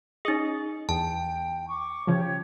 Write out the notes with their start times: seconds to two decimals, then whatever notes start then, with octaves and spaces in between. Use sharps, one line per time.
0.25 C#4 D#4 G#4 D#5
0.89 E2 G5 A5
1.68 C#6 D6
2.07 C#3 F3 G4 C#5